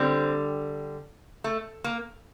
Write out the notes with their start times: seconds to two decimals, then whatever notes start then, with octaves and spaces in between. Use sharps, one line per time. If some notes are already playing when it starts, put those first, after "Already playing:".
Already playing: D3 G3 C4
1.44 A3
1.84 A#3